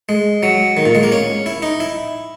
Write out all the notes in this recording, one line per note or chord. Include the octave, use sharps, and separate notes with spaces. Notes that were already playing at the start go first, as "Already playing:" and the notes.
G#3
F#3
D#3
A#2
G#3
A#3
C#4
E4
D#4
E4